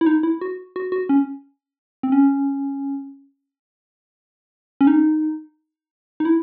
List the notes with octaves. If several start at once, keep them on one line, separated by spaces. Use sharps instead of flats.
E4
D#4
E4
F#4
F#4
F#4
C#4
C4
C#4
C#4
D#4
D#4
E4